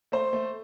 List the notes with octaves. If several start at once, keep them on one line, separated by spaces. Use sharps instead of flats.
A3 C5
A3